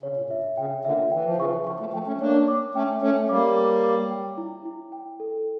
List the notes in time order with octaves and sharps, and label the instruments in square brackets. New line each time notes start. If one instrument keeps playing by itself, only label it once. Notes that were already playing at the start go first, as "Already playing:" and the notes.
[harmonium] C#3 [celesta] C#5
[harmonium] A#2
[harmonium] G2 [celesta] E5
[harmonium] A#2
[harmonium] C#3 [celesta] G5
[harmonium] A#2 D3 [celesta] E5
[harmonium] E3 [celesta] G5
[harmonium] F3
[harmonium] C#3 E3 [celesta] C#6
[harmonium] D3 F3 [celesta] C#6
[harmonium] F3 A3
[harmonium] F3 A3 [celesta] G5
[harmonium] A3 C#4
[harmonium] A#3 D4 [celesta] C#5
[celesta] D6
[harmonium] A3 C#4 [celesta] G5
[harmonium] A3 C#4 [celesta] C#5
[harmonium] G3 A#3 [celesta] D6
[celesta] D6
D6
G5
E4
E4
G5
A4